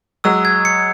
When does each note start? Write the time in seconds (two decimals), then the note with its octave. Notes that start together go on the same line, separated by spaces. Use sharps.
0.24 F#3 G#3 E6
0.45 G#6
0.65 C#7